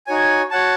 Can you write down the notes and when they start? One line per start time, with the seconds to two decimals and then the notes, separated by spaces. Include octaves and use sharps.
0.07 D#4 F#4 C#5 G#5
0.51 F#4 C#5 F#5 A5